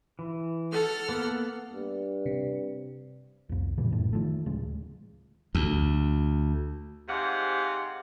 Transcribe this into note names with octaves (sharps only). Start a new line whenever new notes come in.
E3
A4 F#5 F6
A#3 B3
G2
C3
C2 F2
A#2 C#3 E3 G3
A#1 F#2 A2
D#3 F3 A3
D1 C#3 G#3
D2
G#2 C3 D5 F5 F#5